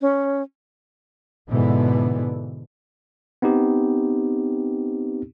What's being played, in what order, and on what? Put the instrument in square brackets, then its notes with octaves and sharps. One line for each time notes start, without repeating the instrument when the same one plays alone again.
[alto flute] C#4
[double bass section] G#2 B2 D3 E3 B3
[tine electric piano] B3 C4 D#4 G4